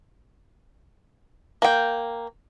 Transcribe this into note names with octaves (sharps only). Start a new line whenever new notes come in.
A#3 G5